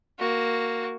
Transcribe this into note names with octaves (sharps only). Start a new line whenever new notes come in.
A#3 F#4